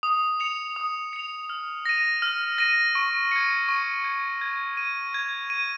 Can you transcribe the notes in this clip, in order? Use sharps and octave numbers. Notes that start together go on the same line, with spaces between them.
D#6
C#7 F7
D#6
C#7 F7
F6
A#6 D#7
F6
A#6 D#7
C#6
G#6 C#7
C#6
G#6 C#7
G#6
D#7
G#6
D#7